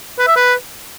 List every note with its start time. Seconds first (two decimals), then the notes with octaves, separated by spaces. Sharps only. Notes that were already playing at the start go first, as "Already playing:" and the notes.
0.19 B4
0.28 E5
0.36 B4